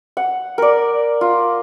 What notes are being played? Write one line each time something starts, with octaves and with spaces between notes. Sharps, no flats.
F#5
A#4 D5
F4